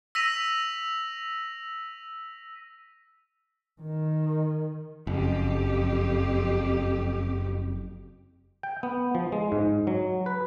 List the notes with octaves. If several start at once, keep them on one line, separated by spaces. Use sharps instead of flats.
E6 A#6 B6 D#7 F7
D#3
F#1 F2 G4
G5
B3
F3
G#3
G#2
F#3
B4